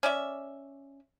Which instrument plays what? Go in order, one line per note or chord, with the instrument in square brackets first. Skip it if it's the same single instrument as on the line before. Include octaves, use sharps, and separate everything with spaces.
[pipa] C#4 D5 E5